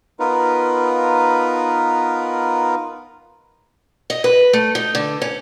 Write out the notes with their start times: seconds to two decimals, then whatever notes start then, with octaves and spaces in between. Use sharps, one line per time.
0.19 B3 D#4 F4 A#4 B4
4.10 D#5
4.24 B4
4.53 A3
4.75 D#4
4.95 D3
5.22 C#4